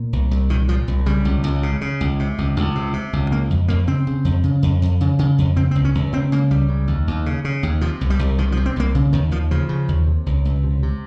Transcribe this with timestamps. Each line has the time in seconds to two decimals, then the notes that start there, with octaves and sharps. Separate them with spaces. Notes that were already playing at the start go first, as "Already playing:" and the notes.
Already playing: A#2
0.13 C2
0.31 C2
0.50 A#2 D#3
0.68 A#2 F3
0.88 C2
1.06 C#3 G3
1.25 C#2
1.44 C#2
1.63 C#3
1.81 C#3
2.01 C#2
2.19 C3
2.38 C#2
2.56 C#2
2.75 C3
2.93 C3
3.13 C#2
3.31 C#3 A#3
3.50 F2
3.68 F2 A#3
3.87 C#3 C4
4.07 C#3
4.25 F2
4.43 C#3
4.63 F2
4.82 F2
5.01 C#3
5.19 C#3
5.38 F2
5.56 C#3 C4
5.71 C4
5.75 C#2
5.85 C#4
5.95 C#2
6.12 C#3 C4
6.32 C#3 A#3
6.50 C#2 G3
6.69 C#3
6.87 D#2
7.07 D#2
7.26 C#3
7.45 C#3
7.63 D#2
7.81 C3 F3
8.01 C2
8.10 G3
8.19 C2
8.38 C3 D#3
8.52 F3
8.57 C3
8.66 C4
8.76 C2 A#3
8.95 C#3
9.13 D#2 D#3
9.31 D#2 F3
9.51 C#3 F3
9.69 C#3
9.88 D#2
10.07 C3
10.26 C#2
10.45 C#2
10.64 C3
10.83 C3